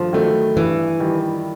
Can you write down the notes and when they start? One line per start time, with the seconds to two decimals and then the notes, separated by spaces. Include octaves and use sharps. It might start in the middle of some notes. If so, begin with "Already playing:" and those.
Already playing: G2 D#3 F3 A3
0.13 D#3 F#3 A3
0.56 G2 E3
1.00 D#3 G3